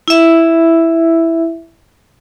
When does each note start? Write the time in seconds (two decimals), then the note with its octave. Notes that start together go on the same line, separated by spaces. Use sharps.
0.08 E4 E5